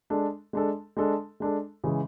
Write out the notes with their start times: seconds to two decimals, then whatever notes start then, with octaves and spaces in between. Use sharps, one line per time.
0.10 G#3 D4 A4
0.53 G#3 D4 A4
0.97 G#3 D4 A4
1.40 G#3 D4 A4
1.84 C#3 E3 G#3